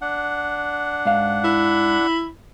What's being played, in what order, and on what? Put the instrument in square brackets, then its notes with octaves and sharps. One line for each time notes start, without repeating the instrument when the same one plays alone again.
[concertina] D4 F#5
[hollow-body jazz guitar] G#2 F5
[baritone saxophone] E4